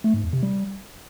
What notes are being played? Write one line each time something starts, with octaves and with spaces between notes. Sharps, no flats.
A3
G#2
E2
C3
G3